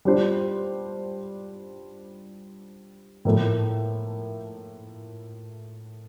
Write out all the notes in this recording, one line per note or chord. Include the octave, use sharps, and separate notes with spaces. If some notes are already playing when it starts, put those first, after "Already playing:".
G3 D4 F4 C5
A2 F3 A#3 E4 A4